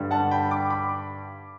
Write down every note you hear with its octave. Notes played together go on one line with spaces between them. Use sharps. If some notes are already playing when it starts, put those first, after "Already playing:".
Already playing: G2 D3 G3
F#5 A5
G5 B5
B5 D6
B5 D6